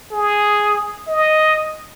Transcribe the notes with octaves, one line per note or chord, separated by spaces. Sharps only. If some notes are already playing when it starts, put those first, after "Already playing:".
G#4
D#5